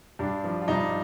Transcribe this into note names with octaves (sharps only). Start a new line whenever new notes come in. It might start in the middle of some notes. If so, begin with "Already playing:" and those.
G2 D4
F3
F4
G2 D#4